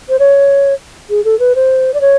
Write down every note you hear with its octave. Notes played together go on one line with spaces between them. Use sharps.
C5
C#5
G#4
A4
B4
C5
D5
C#5